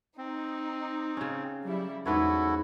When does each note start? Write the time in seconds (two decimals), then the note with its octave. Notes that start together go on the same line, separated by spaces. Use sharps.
0.18 C4 D#4
1.17 C#3 C#4
1.63 F#3 G3 E4
2.06 E2 G#2 E4 F#4 A4 B4 C#5